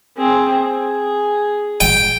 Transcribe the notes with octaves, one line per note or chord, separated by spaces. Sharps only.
C4 G#4
G#4
G5